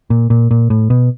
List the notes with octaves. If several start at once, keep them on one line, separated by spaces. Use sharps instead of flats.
A#2
A#2
A#2
A2
B2